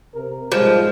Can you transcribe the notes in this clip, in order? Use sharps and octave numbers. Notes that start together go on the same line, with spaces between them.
C3 A#4
G#2 F3 G3 G#3